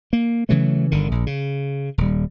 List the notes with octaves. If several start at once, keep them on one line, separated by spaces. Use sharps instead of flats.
A#3
C#3 E3 F#3 A3
G1 D3 D#3
A#1
C#3
D#1 G3